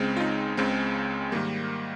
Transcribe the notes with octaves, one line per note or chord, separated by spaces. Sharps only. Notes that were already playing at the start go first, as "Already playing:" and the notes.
Already playing: C#2 C#3 G#3 C4
F4
D#4
C#2 C#3 G#3 C4
G#2 D#3 G3 A#3